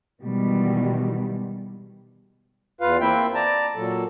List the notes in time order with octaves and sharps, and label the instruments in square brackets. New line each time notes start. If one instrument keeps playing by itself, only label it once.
[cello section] B2 D#3 E3 G3 G#3
[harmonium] E2 F4 B4 F5
A#3 C4 E4 E5 G5
D5 A5 A#5
A#2 F#3 A4